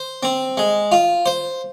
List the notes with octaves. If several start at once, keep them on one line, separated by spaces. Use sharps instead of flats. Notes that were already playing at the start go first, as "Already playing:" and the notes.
Already playing: C5
C4
G#3
F4
C5